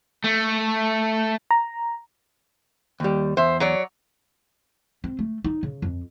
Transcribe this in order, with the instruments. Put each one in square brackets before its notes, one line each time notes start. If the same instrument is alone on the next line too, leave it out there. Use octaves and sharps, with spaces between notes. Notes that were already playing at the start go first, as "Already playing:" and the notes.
[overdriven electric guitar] A3
[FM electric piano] A#5
[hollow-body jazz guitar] D#2 G3
[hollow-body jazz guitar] E2 [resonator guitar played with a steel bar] C5 E5
[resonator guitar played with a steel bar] F#3 C#5 D5
[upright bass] C4
A3
D#4
C#3
F2